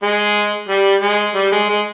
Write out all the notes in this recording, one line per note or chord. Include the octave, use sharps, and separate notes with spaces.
G#3
G3
G#3
G3
G#3
G#3